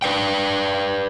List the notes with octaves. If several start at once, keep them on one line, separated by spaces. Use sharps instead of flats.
B4 D5 G5